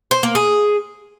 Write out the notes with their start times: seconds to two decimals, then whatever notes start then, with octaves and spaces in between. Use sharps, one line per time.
0.11 C5
0.23 A#3
0.35 G#4